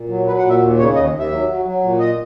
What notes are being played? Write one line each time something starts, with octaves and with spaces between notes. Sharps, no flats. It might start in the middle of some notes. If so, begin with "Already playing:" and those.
Already playing: A#2
F#3
F#3 B4
F#5
A#2
E5
D#2
C#3 C#5
D#2 D#5
D#2
E5
F#3
F#3
F#3
A#2
D#5